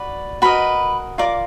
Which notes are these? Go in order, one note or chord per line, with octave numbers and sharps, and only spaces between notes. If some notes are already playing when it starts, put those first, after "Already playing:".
Already playing: F#4 B4 D5
F#4 A#4 B4 D#5 B5
F4 A#4 D5 D6